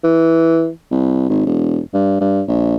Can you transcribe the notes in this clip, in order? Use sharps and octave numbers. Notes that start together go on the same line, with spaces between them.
E3
C2
G#1
E1
G2
G2
A#1